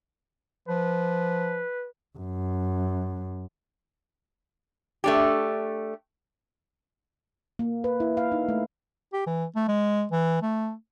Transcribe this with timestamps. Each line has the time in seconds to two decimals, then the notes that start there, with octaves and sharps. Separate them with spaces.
0.68 F3 B4
2.18 F#2
5.04 A3 D4 G4
7.59 A#3
7.84 B4
8.00 E4
8.17 F5
8.32 D#4
8.48 A3
9.13 G4
9.27 E3
9.55 A3
9.68 G#3
10.12 E3
10.42 A3